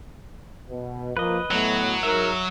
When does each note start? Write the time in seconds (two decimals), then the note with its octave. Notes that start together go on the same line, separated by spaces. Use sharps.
0.70 B2
1.17 F3 A#3 B4 D#5
1.51 A2 F#3 A3 B3
2.03 G#2 A#4 E5